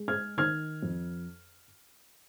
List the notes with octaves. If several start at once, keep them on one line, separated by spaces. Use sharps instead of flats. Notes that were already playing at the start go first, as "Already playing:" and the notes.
Already playing: G#3
F6 G#6
D#3 F6 G#6
F2